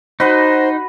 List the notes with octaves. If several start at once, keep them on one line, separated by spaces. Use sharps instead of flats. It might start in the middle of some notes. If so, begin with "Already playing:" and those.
D#4 F#4 B4 C5 F#5